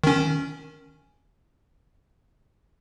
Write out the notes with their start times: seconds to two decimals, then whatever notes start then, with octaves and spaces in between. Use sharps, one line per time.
0.04 D#3 C#4